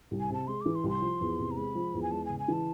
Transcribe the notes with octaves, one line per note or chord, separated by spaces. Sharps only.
C2
G#5
C3 A5
G#3 C6
E3 D6
C6
C2
C6
F3
E2
C3
A#5
G#3 B5
F3
E2
G#5
G#3 A5
C#3 G#5
G#5
E3 A5